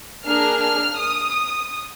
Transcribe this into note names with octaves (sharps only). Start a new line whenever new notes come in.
A#3 D4 G#4 F6
F6
D#6